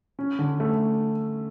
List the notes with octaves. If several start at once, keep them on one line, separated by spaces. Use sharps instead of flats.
C#4
D3
A3